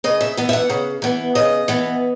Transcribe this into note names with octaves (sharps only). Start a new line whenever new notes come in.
C#3 D#5
E5
E3 B3
E5
F#5
C#3
E3 B3
C#3 D#5
E3 B3